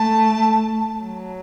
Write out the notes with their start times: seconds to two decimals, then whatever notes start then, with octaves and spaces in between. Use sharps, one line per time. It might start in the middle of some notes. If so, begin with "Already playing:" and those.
Already playing: A3 A5
1.01 F#3